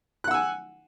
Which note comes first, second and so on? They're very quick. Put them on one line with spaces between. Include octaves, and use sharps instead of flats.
F#6 F#5 E6 G#5